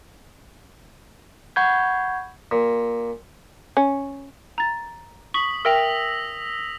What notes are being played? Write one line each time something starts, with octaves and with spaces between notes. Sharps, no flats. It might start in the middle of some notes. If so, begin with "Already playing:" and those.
F#5 B5 C#6 G6 G#6
A#2
C#4
A#5 A6
C#6 D#6 B6 F#7
A#4 E5 G5 E6 A#6 F7